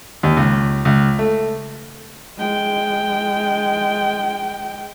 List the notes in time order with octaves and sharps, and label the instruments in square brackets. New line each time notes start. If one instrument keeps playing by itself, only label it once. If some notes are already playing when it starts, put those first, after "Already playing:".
[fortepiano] D#2
C#2
C#2
A3
[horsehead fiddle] G#3 G5